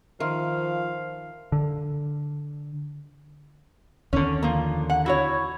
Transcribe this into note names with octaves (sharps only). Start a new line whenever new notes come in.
D#3 F3 E5 F5 C6 F6
D3
D#2 D3 C#4
F3 A#3
F#5
E4 F#4 C#5